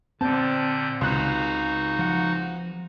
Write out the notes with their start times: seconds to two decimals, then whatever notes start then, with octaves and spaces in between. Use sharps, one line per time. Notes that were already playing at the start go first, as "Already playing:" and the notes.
0.21 A#2 D3 C4 D5 A5 G6
1.01 C#2 D#4 F#4 F#6
1.99 F3 F#5